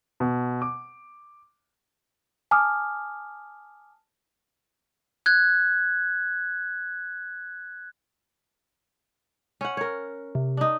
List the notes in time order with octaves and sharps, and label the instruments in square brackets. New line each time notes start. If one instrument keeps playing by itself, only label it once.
[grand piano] B2
D6
[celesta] G#5 A5 D6 D#6 F6
[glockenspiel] F#6 G#6
[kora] C#4 F#5
A#4 C#5
[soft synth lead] C3
[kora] D4 D#4